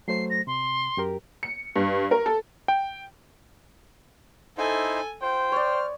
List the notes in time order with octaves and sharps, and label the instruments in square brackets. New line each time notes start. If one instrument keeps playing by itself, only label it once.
[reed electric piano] F#3 A3 C5 [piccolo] C7
[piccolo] A#6
[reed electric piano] C3 [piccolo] C6
[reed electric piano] F#2 G4 A#4
[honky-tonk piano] C#7
G2
A#4
A4
[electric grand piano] G5
[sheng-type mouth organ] D#4 E4 C5 [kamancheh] A4 G#5
[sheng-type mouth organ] F4 [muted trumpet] C5 [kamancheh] G5
[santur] C#5 D5 [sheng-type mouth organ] F6